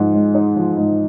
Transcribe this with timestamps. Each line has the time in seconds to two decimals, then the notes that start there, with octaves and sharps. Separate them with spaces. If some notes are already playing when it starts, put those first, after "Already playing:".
Already playing: G#2 F3
0.14 G#3
0.34 D#4
0.56 F3
0.77 G#2